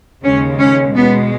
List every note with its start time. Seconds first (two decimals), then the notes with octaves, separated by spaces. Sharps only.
0.24 D#2 C#3 G#3 C#4
0.60 C#4
0.95 B2 G#3 B3